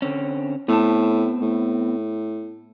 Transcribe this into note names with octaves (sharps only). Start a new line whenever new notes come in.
D3 C4 C#4
A2 B3 C4 A5
A2